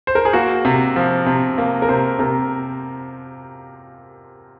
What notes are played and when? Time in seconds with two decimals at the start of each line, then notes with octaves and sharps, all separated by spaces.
0.07 C5
0.15 A#4
0.25 G#4
0.33 A#3 F#4
0.65 C3
0.96 F3
1.26 C3
1.58 A#3
1.82 A#4
1.88 C3 C5
2.19 C3 A#4